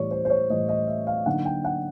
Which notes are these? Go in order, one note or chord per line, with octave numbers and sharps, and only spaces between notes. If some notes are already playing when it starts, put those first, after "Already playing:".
Already playing: A2 E3 G3 C#5 D5
C5
C5
C#5
A2 E3 G3 D#5
D#5
E5
F5
D3 F#3 A#3 D#4 F#5
G5
F#5